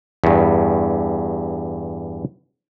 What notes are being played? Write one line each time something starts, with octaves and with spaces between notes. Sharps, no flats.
E2 G2